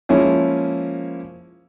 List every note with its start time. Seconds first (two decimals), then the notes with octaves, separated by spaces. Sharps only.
0.09 F3 G#3 A#3 C#4 E4